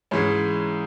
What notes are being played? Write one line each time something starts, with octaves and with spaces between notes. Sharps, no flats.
G#2 E3 G#3 C#4